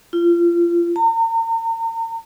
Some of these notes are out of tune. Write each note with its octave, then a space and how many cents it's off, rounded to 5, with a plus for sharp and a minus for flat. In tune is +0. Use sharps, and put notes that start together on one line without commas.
F4 -30
A#5 -40